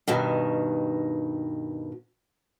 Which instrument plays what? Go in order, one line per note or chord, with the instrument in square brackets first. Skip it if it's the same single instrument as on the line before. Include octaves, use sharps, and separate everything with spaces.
[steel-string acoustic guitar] G2 B2 D#3